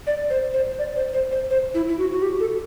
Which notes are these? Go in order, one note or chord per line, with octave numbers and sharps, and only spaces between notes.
D5
C5
C5
D5
C5
C5
C5
C5
E4
E4
F#4
F#4
G4
A4